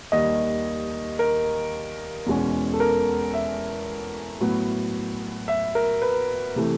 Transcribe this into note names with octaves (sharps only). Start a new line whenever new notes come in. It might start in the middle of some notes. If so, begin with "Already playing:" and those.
D#2 D#3 G3 D#5
A#4
E2 B2 G#3 C#4
A4
A#4
E5
A2 F#3 B3
E5
A#4
B4
C3 E3 A3